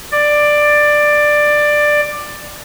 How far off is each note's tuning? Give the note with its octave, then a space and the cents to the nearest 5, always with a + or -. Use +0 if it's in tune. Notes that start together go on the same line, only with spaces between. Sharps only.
D5 +10